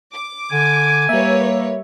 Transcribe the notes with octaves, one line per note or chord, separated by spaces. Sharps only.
D6
D3 G#5
G3 A#3 A#4 B4 C#5 E5